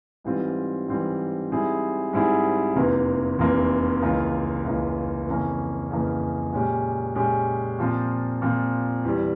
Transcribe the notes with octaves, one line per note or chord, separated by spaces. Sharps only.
G#2 E3 G3 C4 F4
G#2 E3 G3 C4 F4
G#2 G3 C4 E4 G#4
G#2 G3 C4 E4 G#4
F1 E2 C3 E3 A#3
F1 E2 C3 E3 A#3
C#2 C#3 E3 A#3 F4
C#2 C#3 E3 A#3 F4
F2 C#3 E3 A#3 C#4
F2 C#3 E3 A#3 C#4
A#2 G#3 C#4 G4
A#2 G#3 C#4 G4
A#2 F3 C4 F4
A#2 F3 C4 F4
E2 E3 G3